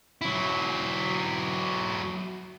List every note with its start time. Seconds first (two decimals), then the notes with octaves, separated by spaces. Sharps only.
0.22 F#3 E4